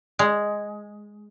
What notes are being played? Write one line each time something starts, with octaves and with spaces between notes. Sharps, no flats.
G#3